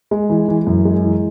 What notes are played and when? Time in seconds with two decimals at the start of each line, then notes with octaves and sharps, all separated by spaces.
0.11 G#3
0.30 E3
0.48 E3
0.67 F#2
0.85 G#3
1.03 E3